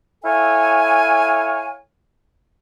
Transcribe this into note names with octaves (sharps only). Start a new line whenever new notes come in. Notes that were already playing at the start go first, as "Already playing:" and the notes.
E4 A4 C#5 F5 G#5